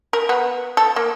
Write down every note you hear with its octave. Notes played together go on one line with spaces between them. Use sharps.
A#4
B3
A4
A#3